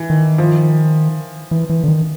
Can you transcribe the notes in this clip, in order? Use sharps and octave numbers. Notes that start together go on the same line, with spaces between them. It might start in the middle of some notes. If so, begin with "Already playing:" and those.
Already playing: E3
D#3
F3
E3
E3
D3
D#3